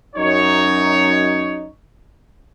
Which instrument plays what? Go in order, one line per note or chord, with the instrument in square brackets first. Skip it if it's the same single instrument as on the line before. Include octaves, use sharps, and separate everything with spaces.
[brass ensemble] F#2 D#4 C#5